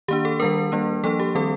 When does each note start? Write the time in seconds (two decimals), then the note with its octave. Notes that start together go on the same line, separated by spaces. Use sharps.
0.08 D#3 A#3 D4 G4
0.25 A4
0.40 D#3 G3 D4 A#4
0.72 G3 A#3 D4
1.04 F3 A#3 D4 A4
1.20 G4
1.35 D#3 G3 C4 A4